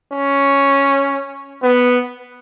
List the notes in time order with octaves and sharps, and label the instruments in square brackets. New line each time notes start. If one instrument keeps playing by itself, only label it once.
[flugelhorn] C#4
B3